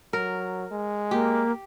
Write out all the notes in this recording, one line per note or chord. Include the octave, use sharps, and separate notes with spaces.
F#3 A#4
G#3
A#3 G4